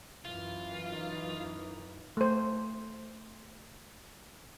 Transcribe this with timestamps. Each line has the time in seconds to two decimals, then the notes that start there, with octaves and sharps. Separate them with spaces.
0.25 F#2 E3 F4
0.93 D#4
2.17 A3 C5